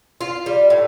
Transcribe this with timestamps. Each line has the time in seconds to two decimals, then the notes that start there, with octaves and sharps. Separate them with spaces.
0.21 F4
0.46 G3
0.70 A2